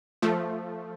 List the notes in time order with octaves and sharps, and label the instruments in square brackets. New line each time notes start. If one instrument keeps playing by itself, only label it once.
[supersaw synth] F3 A3